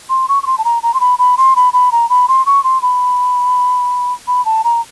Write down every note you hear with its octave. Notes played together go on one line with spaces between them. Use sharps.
C6
C#6
C#6
C6
A5
A#5
A#5
C6
B5
B5
C6
B5
B5
A#5
B5
C6
C#6
C6
B5
B5
A5
A#5